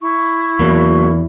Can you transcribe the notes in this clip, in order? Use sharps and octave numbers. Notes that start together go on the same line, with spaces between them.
E4 C#6
E2 C3 F#3 A#3